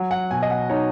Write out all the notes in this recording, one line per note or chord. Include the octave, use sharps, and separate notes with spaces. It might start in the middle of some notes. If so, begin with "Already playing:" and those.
Already playing: F#3
F#5
B2 G#5
D#5
F#5
D#4 C#5